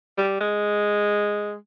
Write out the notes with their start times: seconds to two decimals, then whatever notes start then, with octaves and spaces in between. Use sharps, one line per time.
0.18 G3
0.40 G#3